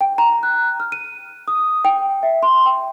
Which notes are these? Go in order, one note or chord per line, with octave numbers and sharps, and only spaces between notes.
G5
A#5
F#6
F6
D#7
D#6
G5
E5
C6
G5